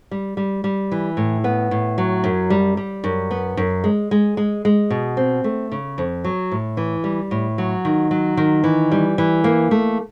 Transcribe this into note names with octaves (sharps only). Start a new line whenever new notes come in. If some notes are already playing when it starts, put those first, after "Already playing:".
G3
G3
G3
E3
A2
B3
A2
F#3
F#2
G3
G3
F#2
B3
F#2
G#3
G#3
G#3
G#3
B2
C4
A3
C#3
F2
F#3
A2
E3
G3
A2
F#3
D#3
F#3
D#3
E3
G3
E3
A#3
A3